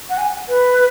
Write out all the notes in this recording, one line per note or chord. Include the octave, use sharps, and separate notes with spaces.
F#5
G#5
B4